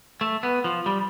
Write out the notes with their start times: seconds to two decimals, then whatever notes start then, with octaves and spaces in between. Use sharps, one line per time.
0.21 A3
0.43 B3
0.64 F3
0.86 G3